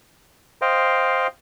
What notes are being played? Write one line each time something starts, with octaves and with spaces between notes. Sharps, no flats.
C5 D#5 F5 G5